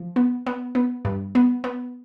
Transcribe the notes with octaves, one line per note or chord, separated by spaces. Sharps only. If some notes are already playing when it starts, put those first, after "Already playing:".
Already playing: F3
B3
B3
B3
G2
B3
B3